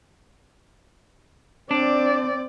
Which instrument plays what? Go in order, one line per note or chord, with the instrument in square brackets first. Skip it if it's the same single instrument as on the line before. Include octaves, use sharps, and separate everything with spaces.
[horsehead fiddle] C4 D5 [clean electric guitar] D4